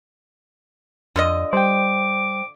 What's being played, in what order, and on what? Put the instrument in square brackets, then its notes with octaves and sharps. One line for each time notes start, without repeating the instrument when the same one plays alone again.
[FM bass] F2 [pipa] D3 F4 D#5
[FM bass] G3 [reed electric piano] C5 G5 [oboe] D6